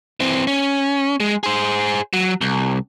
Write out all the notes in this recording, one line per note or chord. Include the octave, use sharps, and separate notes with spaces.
E3 C4
C#4
G#3
G#4 C5
F#3
C2